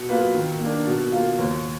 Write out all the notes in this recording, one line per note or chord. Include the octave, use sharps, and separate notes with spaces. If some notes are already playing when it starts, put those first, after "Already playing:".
Already playing: B2
F#3 A#3 F4 B4
D#3
A#3 D4
B2
A#3 F4
D#2